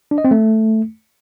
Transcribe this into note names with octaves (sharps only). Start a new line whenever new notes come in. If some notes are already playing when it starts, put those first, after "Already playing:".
D4
D#5
C4
A3